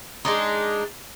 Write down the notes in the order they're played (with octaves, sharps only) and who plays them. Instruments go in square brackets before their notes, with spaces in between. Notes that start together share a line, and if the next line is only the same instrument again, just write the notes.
[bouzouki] G#3 D4 D#4